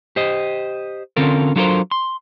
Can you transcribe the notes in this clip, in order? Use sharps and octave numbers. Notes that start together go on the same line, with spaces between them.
G4 C5 D#5
D3 C4 C#4 F4 A4 A#4
F#3 D4 F4 A4 A#4 C5
C6